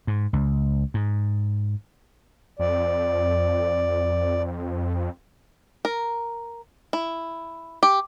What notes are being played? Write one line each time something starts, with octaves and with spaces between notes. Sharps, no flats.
G#2
C#2
G#2
F2 D5
A#4
E4
G4